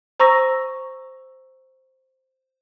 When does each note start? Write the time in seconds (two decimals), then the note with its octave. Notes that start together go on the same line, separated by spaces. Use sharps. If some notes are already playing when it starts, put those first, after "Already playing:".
0.20 C5 A#5 C#6 E6 A#6